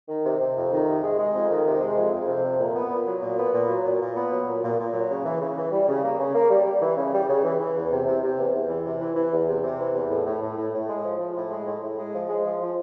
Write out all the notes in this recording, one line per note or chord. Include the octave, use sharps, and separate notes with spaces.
D#3
C3
C3
F2
D#3
C3
G#3
G#3
F2
D#3
C3
G#3
F2
F2
C3
F2
A#2
B3
A#2
F#3
A#2
B3
A#2
F#3
A#2
A#2
B3
F#3
A#2
A#2
A#2
F#3
C#3
E3
C#3
E3
G3
C#3
A#3
C#3
A#3
G3
G3
E3
C#3
G3
C#3
E3
E3
E2
C3
C3
C3
E2
E2
E3
C3
E3
E3
E2
C3
C3
E3
E2
A2
A2
A2
A2
A2
G#3
F3
F3
A2
G#3
A2
A2
G#3
F3
G#3
F3
F3